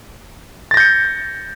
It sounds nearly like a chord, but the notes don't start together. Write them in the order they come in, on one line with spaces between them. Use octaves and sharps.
A6 A#6 G6 C#7